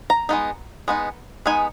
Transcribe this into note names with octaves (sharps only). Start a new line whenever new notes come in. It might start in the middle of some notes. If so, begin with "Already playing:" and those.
A#5
G#3 B3 D#4
G#3 B3 D#4
G#3 B3 D#4 G#5